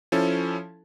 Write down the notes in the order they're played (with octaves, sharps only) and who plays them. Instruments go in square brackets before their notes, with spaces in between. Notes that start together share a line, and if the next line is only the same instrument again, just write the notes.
[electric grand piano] F3 C#4 E4 A4